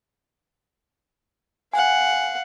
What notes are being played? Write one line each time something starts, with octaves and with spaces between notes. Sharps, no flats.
F5 F#5 G#5